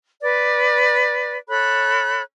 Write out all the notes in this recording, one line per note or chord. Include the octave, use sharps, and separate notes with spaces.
B4 D5
A4 C#5 B5 F#6